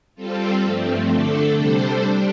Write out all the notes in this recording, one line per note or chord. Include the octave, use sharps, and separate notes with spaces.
G3 C4 F4 A4
G2 F3 A3 C4
D3 A3 D4 A4
C3 G3 D4 A4 C5
G3 D4 G4